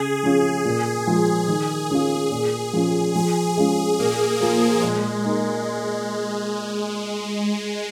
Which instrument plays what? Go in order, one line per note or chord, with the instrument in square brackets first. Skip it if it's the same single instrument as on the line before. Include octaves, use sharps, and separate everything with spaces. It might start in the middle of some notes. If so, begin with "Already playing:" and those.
Already playing: [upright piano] C#3 [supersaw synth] G#4
[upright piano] F3 C#4 F4
A#2
F3 G#3
D#3
C#4 F4
[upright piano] A#2 [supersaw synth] G#4
[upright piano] F3 C#4 F4
[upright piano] F3 [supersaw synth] G#4
[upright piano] G#3 C#4 F4
[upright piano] A#2 [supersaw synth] A#3
[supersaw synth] F3 [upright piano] A#3 F4
[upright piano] A#2 [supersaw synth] G#3
[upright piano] A#3 D#4